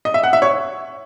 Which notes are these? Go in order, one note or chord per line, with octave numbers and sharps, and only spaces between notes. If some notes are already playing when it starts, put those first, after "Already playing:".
D#5
E5
F#5
E5
C#5